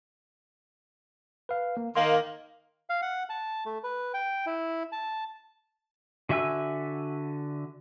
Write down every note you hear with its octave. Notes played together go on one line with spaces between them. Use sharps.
B4 F5
A#3
D#3 A#3 D#5 F5 C6
F5
F#5
A5
A3
B4
G5
E4
A5
D3 F#4 E5 G#5 E6